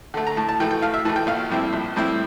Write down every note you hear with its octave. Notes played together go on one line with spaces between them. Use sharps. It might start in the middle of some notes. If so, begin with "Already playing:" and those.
D3 A3
A#5
A2 A5
A5
E3 A3 G5
G5
A2 F5
E5
E3 A3 A5
G5
A#1 F5
A2 G3 C4 E4
A#1
A2 G3 C4 E4